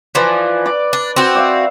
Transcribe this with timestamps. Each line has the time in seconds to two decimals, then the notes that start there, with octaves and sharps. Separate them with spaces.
0.15 E3 F3 B4 D5
0.66 D5 D6
0.93 D4
1.16 C4 F#4
1.35 D5 E5 F5